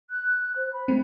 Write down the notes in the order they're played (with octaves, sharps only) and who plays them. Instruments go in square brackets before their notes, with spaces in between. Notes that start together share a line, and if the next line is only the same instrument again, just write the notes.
[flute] F#6
C5
B5
[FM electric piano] G#3 A3 C4